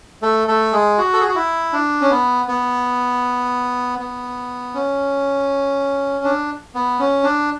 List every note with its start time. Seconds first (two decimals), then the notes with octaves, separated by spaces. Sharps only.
0.22 A3 A4
0.48 A3 A4
0.72 G#3 G#4
0.98 F#4
1.13 A4
1.21 G#4
1.28 F#4
1.35 E4
1.73 D4
2.01 C#4
2.10 B3
2.48 B3
3.99 B3
4.74 C#4
6.24 D4
6.75 B3
6.99 C#4
7.24 D4